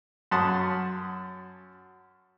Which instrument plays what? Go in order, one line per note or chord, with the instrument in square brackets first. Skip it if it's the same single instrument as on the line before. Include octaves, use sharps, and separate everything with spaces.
[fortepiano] F#2 F#5 A5 C6 D#6